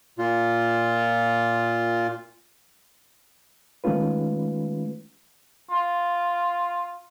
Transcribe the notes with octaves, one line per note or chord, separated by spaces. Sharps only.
A#2 F4
D#3 G#3 A3 C#4 F4 B4
F4